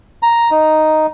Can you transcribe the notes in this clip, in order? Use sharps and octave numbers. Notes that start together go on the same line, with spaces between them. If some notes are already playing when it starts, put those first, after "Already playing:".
A#5
D#4